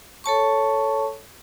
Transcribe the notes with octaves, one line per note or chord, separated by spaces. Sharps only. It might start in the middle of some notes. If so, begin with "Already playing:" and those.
A4 C#5 A5 C#6